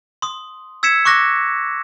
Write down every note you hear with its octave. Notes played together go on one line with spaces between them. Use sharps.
C6 D#6
E6 G#6 B6 C#7 E7
C#6 D6 F#6 A#6